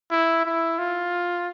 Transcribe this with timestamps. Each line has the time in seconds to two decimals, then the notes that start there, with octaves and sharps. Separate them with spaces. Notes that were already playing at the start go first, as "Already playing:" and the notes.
0.11 E4
0.46 E4
0.79 F4